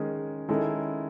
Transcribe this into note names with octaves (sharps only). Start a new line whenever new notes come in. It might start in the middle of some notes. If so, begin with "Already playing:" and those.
Already playing: D#3 G#3 C#4 G#4
D#3 G#3 C#4 E4 A4